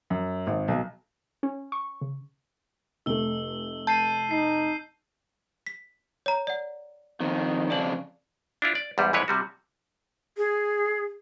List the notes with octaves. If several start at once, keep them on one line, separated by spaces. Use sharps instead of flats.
F#2
G#1
B1
C#4
C#6
C#3
F1 A3 E6 G7
A5 G6 C7 D#7
D#4 C7
B6
C#5 A#5
D5 F#5
F2 D#3
F2 C#3 D4 D5 F#7
D4 E4 F4
D5
E2 G#2 G3
F2 E3 G#3 E4 B4 C#5
C3 G3 F#4
G#4